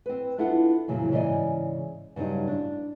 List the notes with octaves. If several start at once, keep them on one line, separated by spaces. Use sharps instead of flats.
C4 B4
D4 E4 F4 A4 F#5
F2 A#2 C#3 E3 F#3
G#2 C#3 E3 D5 D#5 G#5
G2 C#3 F#3 G3 D#4
D4